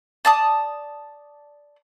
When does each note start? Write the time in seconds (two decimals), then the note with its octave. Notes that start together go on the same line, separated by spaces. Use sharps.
0.25 D5 A5 D#6